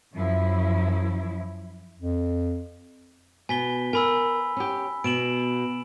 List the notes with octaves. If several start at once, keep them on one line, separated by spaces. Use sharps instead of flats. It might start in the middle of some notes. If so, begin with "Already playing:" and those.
F#2 F3 E4
F2
B2 G#5 B6 G7
A#4 G#5 B5 E6
C#4 G4
B2 D7 E7 F#7